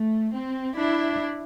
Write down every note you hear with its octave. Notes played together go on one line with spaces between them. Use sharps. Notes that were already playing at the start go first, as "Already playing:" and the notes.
Already playing: A3
C4
D4 E4